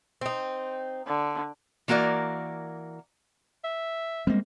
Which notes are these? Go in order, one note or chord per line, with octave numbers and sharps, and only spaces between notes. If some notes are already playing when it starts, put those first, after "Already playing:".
C4 D#4
D3
E3 A#3 F#4 A#4 D5
E5
G3 G#3 A#3 C4